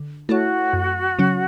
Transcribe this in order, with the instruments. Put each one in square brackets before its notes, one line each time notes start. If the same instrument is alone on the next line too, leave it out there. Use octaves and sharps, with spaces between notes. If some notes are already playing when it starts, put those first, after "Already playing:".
Already playing: [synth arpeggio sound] D3
[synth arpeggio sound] A3 E4 A4 C#5 [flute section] F#4
[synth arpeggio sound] F#2
C#3 F#3 C#4